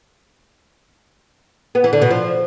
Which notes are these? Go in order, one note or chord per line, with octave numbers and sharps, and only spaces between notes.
B3
E3
D3
B2
F3